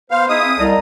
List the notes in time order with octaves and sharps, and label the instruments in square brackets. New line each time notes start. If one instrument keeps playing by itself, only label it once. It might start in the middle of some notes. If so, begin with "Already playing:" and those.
[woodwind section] B3 C5 [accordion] F5
[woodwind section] G#3 D#4 E4 [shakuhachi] D#5 [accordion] D#6
[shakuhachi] C4
[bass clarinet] C2 [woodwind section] A4 D#5 A#5 [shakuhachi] D5